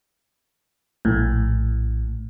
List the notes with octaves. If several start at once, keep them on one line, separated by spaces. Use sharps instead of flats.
A#1 A2